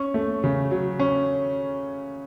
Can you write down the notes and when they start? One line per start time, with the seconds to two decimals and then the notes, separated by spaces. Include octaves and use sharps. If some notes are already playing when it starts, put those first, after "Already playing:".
Already playing: C#4 C#6
0.14 A3
0.44 C#3
0.71 F#3
0.99 C#4